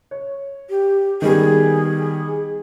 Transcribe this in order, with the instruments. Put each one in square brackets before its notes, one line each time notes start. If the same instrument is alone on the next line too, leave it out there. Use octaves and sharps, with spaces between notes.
[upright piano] C#5
[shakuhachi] G4
[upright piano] D#3 G3 B3 [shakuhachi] G#4